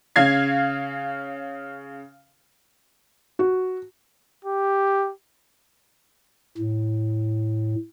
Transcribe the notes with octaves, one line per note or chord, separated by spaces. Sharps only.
C#3 F5 G#6 C7
F#4
G4
A2